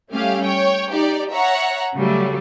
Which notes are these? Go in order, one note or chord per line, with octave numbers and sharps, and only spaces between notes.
G3 A3 C#4 G4 F5
C#5 G5
D#4 G4 D5
C#5 E5 F#5 A#5
C#3 F#3 G3 A3